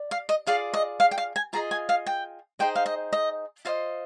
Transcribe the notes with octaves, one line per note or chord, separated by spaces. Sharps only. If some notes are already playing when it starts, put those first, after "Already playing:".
Already playing: D5
F5
D#5
F4 G#4 D5 F5
D#5
F5
G5
F5
G#5
F4 G#4 D#5 A#5
G#5
F5
G5
D#4 G#4 C5 D#5 G5
F5
D#5
D#5
F4 C5 D#5 F5